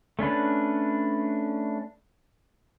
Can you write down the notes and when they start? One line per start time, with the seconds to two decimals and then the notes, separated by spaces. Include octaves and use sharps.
0.19 A3 C#4 D4 B4